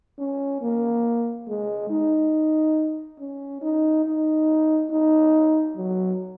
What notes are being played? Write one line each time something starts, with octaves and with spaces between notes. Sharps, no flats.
C#4
A#3
G#3
D#4
C#4
D#4
D#4
D#4
F#3